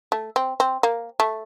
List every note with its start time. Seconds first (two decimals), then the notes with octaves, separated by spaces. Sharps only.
0.12 A3
0.36 C4
0.60 C4
0.83 A#3
1.20 A3